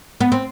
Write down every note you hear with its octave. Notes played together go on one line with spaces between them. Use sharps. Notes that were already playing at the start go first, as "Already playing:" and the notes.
B3
C4